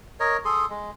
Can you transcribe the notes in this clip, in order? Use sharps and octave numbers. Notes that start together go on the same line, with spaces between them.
A#4 C#5 D#5
G#4 A4 C6 D#6
G#3